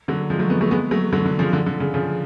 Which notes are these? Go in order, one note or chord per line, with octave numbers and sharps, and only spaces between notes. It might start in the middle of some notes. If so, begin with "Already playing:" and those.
D3 F#3
F3 G#3
F#3 A3
G#3 B3
F#3 A3
G#3 B3
F#3 A3
D3 F#3
D3
C#3 F3
D3
D3
C#3
C#3 F3